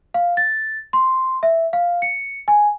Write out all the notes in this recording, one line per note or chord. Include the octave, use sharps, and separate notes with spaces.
F5
A6
C6
E5
F5
C#7
G#5